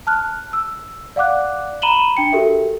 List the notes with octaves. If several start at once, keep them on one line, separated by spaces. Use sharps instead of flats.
A5 F6 F#6
E6
D5 F5 F#5 D6 F#6
A#5 B5 D#7 E7 F#7 G7
D4 G5 C#7
F#4 G4 A4 A#4 E5